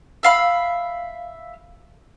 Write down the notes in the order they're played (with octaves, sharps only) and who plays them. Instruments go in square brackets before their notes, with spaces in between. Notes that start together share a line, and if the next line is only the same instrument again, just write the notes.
[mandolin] E5 F5 B5